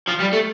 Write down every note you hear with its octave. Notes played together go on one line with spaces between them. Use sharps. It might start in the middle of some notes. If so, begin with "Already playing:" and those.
F3
G3
A3